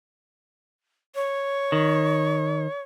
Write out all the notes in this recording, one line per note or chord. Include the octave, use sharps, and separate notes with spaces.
C#5
D#3